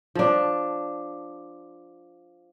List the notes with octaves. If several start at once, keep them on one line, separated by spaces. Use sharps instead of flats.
F3 D4